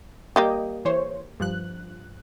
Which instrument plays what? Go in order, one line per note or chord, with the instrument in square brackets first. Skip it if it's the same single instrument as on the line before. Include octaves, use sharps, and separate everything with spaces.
[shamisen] G3 A#3 G4 [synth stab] D#5
[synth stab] E3 C5 C#5
G2 F3 F#6